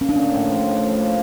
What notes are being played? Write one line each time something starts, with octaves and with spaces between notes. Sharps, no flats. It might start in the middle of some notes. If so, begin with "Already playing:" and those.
A#3 C#4
D4
A2 C#4
A2
F3
A2
F3
A#3